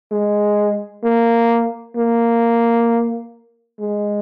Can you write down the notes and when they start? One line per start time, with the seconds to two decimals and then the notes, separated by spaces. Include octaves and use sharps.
0.12 G#3
1.04 A#3
1.96 A#3
3.80 G#3